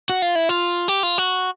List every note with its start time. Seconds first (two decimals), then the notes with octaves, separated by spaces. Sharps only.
0.10 F#4
0.22 F4
0.35 E4
0.49 F4
0.88 G4
1.03 F4
1.18 F#4